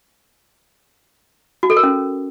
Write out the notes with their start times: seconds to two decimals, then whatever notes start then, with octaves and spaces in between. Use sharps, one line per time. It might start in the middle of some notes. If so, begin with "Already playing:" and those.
1.63 F#4
1.70 A4
1.77 A#4
1.83 C#4